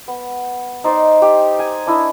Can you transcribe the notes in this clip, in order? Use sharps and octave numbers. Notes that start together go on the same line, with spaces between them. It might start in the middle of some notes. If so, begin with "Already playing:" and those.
B3
D#4 C5 D5
G4
G#5
D4 E4 D#5